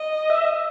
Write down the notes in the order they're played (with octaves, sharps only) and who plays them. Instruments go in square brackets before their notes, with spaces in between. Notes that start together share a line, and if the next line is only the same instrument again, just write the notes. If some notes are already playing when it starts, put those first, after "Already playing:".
Already playing: [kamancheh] D#5
[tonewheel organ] E5